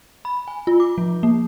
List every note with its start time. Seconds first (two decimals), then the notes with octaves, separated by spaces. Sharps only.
0.25 B5
0.48 G#5
0.67 F4
0.80 D6
0.98 F3
1.23 A#3